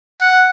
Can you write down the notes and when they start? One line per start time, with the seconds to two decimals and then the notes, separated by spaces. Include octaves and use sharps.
0.21 F#5